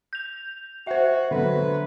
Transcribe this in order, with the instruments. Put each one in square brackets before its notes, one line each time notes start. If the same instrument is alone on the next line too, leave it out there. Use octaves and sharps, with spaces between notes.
[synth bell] G6 F7
[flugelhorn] F#4 [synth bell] C5 E5
[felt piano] D3 F#3 [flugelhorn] B4